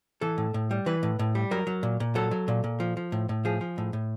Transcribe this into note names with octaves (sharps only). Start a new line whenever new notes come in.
E3 A4
A2
A2
G3
E3 B4
A2
A2
G3
F#3 A#4
F#3
A#2
A#2
F#3 A4
F#3
A#2
A#2
F3
F3
A2
A2
F3 G#4
F3
A2
A2